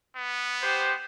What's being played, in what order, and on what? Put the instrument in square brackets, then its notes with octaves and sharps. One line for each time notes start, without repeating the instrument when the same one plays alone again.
[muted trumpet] B3
[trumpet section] G4 C5